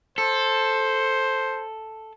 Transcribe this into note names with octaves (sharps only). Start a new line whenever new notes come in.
A4 C5